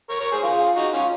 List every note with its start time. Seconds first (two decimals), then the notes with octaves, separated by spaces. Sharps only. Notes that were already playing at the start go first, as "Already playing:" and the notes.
0.09 A#4 C#5
0.20 A#4 C#5
0.32 G#4 C5
0.43 F4 G#4
0.76 D#4 F#4
0.93 C#4 F4